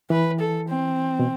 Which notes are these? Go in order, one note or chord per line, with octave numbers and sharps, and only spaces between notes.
E3 B4
A4
C4
B2